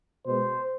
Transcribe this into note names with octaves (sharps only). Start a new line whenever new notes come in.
B2 G#3 C5